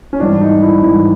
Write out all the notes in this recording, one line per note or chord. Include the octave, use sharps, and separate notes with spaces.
C#4
G#1 G2 E3 D4
D#4
E4
G#1 G2 E3 E4